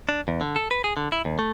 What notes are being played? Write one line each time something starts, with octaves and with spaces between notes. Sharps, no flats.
D4
E2
D3
A4
B4
G#4
D3
E4
D#2
A3